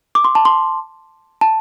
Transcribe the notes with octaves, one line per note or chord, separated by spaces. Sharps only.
D6
C6
A5
C6
A5